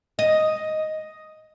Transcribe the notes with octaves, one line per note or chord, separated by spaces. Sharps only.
D#5